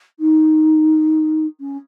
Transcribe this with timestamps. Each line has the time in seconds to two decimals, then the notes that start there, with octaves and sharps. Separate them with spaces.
0.20 D#4
1.60 C#4